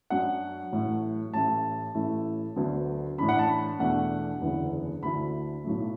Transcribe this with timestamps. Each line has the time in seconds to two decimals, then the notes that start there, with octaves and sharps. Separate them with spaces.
0.10 F#2 F#3 D4 F#5
0.72 A1 A2 F#3 A3
1.33 A1 A2 A3 E4 A5
1.95 A1 A2 A3 E4
2.56 D2 D3 F#3 B3
3.18 A2 E3 D4 B5
3.29 F#5
3.39 A5
3.48 B5
3.79 E2 B2 A3 D4 F#5
4.41 F#1 E2 D3 B3 E4
5.03 D2 D3 A3 E4 B5
5.64 B1 A2 F#3 A3